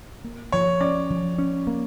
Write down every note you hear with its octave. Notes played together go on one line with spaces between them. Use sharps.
A#3
F3 C#5
C#4 D5
F3
C#4
A#3